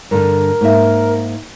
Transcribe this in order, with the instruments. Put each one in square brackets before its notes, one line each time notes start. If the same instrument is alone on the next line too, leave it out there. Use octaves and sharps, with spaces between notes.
[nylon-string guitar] G2 D3 [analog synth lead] A#4
[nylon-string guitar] G#2 A#3 E5